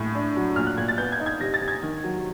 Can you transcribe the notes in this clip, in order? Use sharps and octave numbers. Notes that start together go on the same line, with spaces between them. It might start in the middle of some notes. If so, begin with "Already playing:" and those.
Already playing: A2
D4
F#3
A#2 F6
F#6
A#2 G#6
A6
B3 G6
G#6
D#4
G#6
C3 A#6
A6
C3
G#6
D#3
F#3